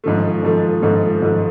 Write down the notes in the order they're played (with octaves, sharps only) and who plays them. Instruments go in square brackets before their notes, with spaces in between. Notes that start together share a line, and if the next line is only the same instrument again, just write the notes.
[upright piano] G#2 F3 A3
G#2 F3 A3
G#2 F3 A3
G#2 F3 A3